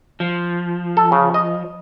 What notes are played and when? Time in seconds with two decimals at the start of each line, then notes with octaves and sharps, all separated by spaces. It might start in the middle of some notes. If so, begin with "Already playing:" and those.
0.20 F3
0.97 A4
1.12 C#3
1.34 D#5